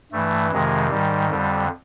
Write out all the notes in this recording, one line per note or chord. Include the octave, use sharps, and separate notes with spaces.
G2 E3 A3
F2 C3 D#3 G#3
G#2 D#3 G3
F2 D3 G3